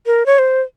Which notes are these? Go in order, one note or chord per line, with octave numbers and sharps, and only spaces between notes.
A#4
C#5
C5